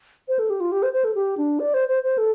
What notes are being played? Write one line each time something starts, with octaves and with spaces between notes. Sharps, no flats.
C5
A4
G4
F4
G4
C5
C5
A4
G4
D4
D5
C5
C5
C5
A4